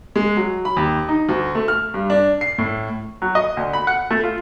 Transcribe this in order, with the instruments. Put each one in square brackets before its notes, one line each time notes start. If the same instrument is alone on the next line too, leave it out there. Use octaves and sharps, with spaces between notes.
[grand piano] G#3
F#3
B5
D#2
D#4
D2
A3
F6
G2
D4
C7
A2
[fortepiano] F#3
D#5
D2
B5
F#5
A3
F4